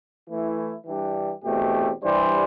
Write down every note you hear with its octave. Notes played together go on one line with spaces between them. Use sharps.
E3 A3 E4
G2 E3 G3 D4 G4
E2 B2 A3 C4 G4
E3 G3 D4 G4 C5